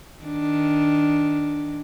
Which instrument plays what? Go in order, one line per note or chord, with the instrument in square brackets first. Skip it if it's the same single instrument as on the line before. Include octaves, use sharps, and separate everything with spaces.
[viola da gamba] D#3 D4